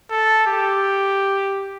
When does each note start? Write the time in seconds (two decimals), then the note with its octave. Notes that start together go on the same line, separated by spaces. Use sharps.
0.10 A4
0.47 G4